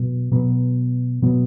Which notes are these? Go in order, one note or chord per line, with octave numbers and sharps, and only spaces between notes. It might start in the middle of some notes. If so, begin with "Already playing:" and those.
Already playing: B2 F#3 B3
B2 F#3 B3
B2 F#3 B3